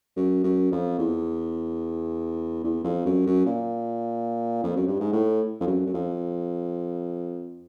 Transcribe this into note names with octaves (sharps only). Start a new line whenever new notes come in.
F#2
F#2
F2
E2
E2
F2
F#2
F#2
A#2
F2
F#2
G2
G#2
A2
F2
F#2
F#2
F2